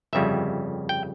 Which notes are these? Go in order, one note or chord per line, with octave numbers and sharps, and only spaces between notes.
G1 F2 C#3 G3 E5
G5